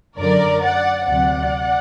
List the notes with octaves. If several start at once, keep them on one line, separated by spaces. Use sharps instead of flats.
F#2 D3 F#3 A#4 D5
D5 F#5
D2 C3 F#3 D5 F#5